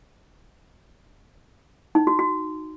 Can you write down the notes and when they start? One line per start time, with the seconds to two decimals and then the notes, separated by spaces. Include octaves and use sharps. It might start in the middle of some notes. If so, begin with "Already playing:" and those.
1.95 D#4
2.07 F#4
2.19 F#4